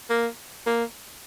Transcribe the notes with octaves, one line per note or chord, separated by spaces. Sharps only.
A#3
A#3